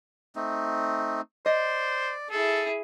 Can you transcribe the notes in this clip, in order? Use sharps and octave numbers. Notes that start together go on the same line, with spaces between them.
A3 C4 D#4
C5 D5 D#5
E4 G#4 A4